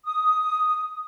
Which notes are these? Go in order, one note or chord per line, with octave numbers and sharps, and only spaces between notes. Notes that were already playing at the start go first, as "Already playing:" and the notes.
D#6